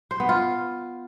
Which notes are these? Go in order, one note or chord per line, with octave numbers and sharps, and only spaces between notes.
C5
B3
F4